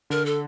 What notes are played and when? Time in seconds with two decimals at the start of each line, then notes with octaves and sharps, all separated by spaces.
0.10 D3 A#4
0.26 A4